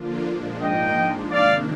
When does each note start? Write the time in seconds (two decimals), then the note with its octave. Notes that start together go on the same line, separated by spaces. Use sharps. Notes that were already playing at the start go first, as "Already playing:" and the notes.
Already playing: D3 F3 A#3 D4 F4
0.27 A#2 F3 G#3 D4
0.61 G#2 F3 A#3 D#4 D#5 G5
0.96 F3 G#3 D4
1.31 C3 D#3 A#3 D4 D5 F5